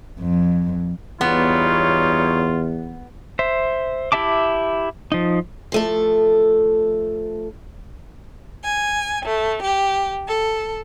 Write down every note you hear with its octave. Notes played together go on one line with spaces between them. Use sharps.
F2
E2 G3 B3 D#4 F4 C#5
C5 E5
E4 G4 E5 A5 D6
F3 D#4
F3 A3 A4
G#5
A3
G4
A4